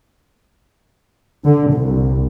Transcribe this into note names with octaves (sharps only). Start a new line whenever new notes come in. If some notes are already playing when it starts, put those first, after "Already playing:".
D3
C2